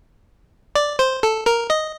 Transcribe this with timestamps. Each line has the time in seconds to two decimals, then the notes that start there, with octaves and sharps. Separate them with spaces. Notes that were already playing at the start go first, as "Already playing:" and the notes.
0.75 D5
0.99 C5
1.23 A4
1.46 A#4
1.70 D#5